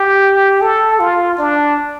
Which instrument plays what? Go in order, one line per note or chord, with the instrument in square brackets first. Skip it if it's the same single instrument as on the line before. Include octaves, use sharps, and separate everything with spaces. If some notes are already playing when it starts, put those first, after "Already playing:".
Already playing: [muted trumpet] G4
A4
F4
D4